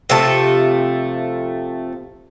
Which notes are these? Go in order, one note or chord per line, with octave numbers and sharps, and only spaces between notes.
C3 F3 A3 A4